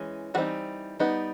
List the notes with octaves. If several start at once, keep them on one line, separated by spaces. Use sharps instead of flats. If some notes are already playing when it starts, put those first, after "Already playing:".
Already playing: E3 G#3 C#4
E3 G3 C4 D#4 F#4
G3 B3 D#4